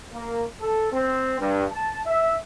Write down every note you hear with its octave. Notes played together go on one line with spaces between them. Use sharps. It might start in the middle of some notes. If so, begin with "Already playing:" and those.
A#3
A4
C4
G2
A5
E5